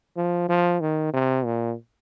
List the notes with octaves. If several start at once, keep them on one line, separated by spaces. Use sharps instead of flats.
F3
F3
D#3
C3
A#2